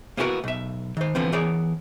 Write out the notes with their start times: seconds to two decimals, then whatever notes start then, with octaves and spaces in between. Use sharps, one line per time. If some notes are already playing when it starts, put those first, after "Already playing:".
0.17 A#3 B3 E4 F#4 G4 A#4
0.44 B1 E5
0.97 D#3 C5
1.15 D3 E3 F3 B3 C4
1.32 E3 B3 G#4 A#4 C#5 D5